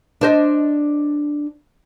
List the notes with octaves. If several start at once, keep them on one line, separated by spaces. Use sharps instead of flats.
D4 C5 D#5